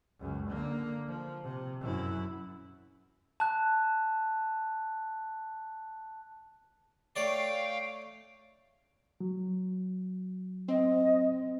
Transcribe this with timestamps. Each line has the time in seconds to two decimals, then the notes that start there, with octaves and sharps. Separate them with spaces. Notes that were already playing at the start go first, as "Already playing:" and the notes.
0.20 C#2 F#2
0.49 D3 A#3
1.08 F3
1.44 C3
1.80 F#2 E4
3.40 A5 F#6
7.16 A3 C#5 D5 F5 G5
9.21 F#3
10.68 C4 D#5